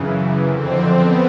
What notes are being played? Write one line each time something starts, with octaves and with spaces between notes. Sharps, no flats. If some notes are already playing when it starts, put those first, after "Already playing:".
Already playing: F#2 C#3 E3
F2 D3 C4
B3